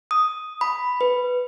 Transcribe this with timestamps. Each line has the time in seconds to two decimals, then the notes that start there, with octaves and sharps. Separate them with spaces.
0.11 D#6
0.61 B5
1.01 B4